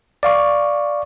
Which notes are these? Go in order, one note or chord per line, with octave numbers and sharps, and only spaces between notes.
D5 F5 C#6